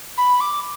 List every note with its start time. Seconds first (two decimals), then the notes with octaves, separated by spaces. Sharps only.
0.17 B5
0.40 D6